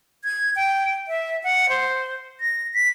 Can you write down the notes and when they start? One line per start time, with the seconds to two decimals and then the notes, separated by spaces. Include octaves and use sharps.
0.24 G#6
0.56 G5
1.08 E5
1.43 F#5
1.69 C5
2.40 A#6
2.74 B6